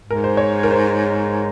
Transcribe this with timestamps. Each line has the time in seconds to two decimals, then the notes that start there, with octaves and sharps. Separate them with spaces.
0.04 G#2
0.11 A#4
0.24 C5
0.37 C#5
0.63 A#4
0.71 C5